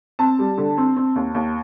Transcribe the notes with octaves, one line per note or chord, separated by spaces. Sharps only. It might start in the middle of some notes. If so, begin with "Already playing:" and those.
C4 A5
G3
D3
C4
C4
D#2
D#2